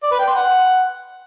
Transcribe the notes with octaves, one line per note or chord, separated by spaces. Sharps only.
D5
B4
G5
C6
F#5